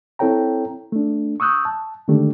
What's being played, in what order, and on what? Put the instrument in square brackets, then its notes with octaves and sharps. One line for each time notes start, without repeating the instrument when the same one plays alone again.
[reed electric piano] C4 E4 A4 C#5 G5 A#5
A3 D4
C#6 D#6 E6 F#6 G6
A5
D3 D#3 G#3 A3 D4 G4